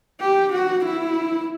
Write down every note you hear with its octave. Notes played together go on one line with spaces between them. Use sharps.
G4
F#4
E4